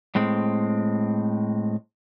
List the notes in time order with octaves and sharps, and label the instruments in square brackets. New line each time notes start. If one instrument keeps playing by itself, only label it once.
[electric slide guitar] A2 G#3 C4